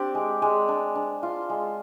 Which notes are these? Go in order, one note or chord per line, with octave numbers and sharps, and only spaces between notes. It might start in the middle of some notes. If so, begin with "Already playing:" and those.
Already playing: C4 D4 G4 D5
G#3
G#3
D4
D4
F4
G#3